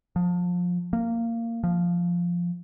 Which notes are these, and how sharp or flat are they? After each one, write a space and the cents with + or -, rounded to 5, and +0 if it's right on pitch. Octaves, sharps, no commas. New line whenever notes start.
F3 +25
A#3 -15
F3 -5